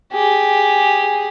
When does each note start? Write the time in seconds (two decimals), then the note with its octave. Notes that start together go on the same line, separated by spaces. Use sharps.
0.13 G4 G#4